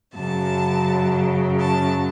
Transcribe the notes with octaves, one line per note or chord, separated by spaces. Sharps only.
F#2 C#3 F#3 A5
A5